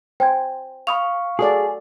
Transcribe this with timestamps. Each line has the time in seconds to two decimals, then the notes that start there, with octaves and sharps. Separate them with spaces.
0.20 C5 G5 G#5 G#6
0.87 F5 B5 C#6 D#6 F7
1.39 F#4 G#4 A4 D5 D#6